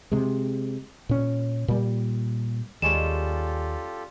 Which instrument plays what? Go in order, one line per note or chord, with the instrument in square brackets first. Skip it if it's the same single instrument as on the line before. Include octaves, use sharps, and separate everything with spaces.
[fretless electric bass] C3 G#3
A#2 C#4
A#2 G3
[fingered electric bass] D#2 [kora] G3 G#3 C#4 [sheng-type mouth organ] F4 G4 A4 [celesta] E7